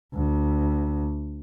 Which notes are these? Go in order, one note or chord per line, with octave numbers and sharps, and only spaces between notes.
D2